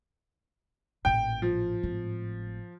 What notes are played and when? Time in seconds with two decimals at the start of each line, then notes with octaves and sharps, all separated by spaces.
1.05 A1 A#2 G5
1.42 F3
1.83 G#1 A2